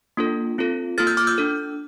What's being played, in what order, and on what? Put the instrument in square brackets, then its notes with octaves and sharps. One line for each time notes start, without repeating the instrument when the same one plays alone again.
[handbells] A#3 D4 F4 A4
C4 F4 A4
A#3 F4 A4 F6 A6
E6 G6
D6 F6
E6 G6
D4 A4